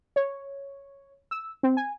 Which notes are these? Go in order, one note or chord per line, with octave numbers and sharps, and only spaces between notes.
C#5
E6
C4
G#5